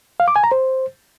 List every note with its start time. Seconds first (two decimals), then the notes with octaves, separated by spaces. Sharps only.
0.20 F5
0.28 D6
0.36 G#5
0.44 A#5
0.52 C5